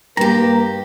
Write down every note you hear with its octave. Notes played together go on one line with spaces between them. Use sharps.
G2 A#3 G4 A#5